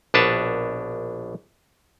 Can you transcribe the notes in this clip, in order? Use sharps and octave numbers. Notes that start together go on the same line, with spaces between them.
A#1 B2 D4 B4 C#5 A5